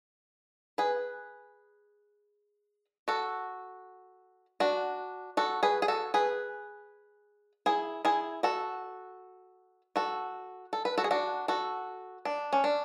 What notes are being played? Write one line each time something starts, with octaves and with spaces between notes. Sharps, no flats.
G#4 B4
F#4 A4
D4 F#4
F#4 A4
G#4 B4
G#4
F#4 A4
G#4 B4
E4 G#4
E4 G#4
F#4 A4
F#4 A4
A4
B4
F#4 A4
G#4
D4 F#4
F#4 A4
D4
C#4
D4